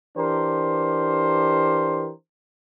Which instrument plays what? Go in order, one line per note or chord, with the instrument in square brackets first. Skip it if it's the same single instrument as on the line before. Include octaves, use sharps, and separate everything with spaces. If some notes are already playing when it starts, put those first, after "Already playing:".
[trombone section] E3 D4 G4 A#4 C5